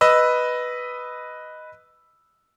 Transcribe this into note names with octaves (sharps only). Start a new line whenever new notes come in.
B4 D#5 B5 E6